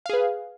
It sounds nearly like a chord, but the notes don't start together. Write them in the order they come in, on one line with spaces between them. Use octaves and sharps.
F5 G#4 B4